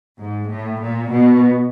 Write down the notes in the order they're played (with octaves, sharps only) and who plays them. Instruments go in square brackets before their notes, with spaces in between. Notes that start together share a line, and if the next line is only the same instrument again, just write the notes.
[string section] G#2
A2
A#2
B2